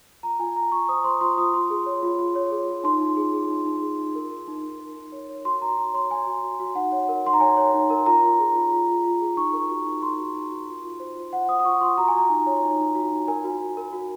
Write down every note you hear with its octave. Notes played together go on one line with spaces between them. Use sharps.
F4 A#5
F4 G#5
F4 A#5
F4 C#6
C5 D#6
C5 C6
F4 C6
F4 D#6
F4 C6
G#4
C#5
F4
F4
C#5
G#4
F4
D#4 C6
D#4
G#4
G#4
D#4
D#4
G#4
D#4
A#4
A#4
D#4
D#4
A#4
D#4
C#5
C#5
F#4 C6
F#4 A#5
F#4 A#5
C#5 C6
C#5 G#5
F#4
F#4
F#4
D#4 F#5
C#5
A#4
D#4 C6
A#5
C#5 G#5
C#5
D#4
A#4
F4 A#5
F4
G#4
F4
F4
F4
F4
G#4
D#4 C#6
A#4
F#4
D#4
D#4 C6
F#4
D#4
F#4
F4
F4
C5
F4
F4 F#5
C5 D#6
D#6
F4 C#6
F4 C6
F#4 A#5
G#5
F#4 A#5
D#4
C#5
D#4
D#4
F#4
D#4
A#4 G#5
F#4
F#4
A#4
F#4